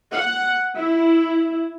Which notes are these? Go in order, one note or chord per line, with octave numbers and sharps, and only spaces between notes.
F#5
E4